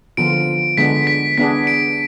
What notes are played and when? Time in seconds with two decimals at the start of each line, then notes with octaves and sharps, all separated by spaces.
0.17 D3 F3 B3 F4 D7
0.77 D3 G#3 B3 D4 B6
1.07 B6
1.38 B3 D4 G#4 B6
1.67 D7